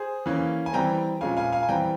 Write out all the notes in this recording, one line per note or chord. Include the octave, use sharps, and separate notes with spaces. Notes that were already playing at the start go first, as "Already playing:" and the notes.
Already playing: G#4 C5
E3 A#3 C#4
G#5
E3 G3 C4 G5 A#5
A#2 F3 G#3 C#4 F5 G#5
F5 G#5
F5 G#5
G#5
E3 G3 C4 G5 A#5